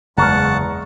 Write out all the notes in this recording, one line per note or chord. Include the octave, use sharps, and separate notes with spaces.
F#1 E2 G#3 F#5 A5 A#5 C#6 F6